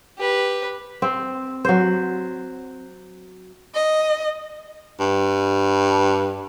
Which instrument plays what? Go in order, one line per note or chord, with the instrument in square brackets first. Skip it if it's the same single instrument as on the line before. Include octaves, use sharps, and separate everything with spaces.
[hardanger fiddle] G4 B4
[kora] C4
F#3 C5
[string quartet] D#5
[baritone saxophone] G2